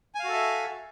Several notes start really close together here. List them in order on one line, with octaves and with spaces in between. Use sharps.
G#5 F5 F#4 A4 E5